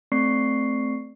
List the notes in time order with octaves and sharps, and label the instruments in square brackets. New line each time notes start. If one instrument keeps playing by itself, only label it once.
[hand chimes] A3 C4 D5 C#6 C7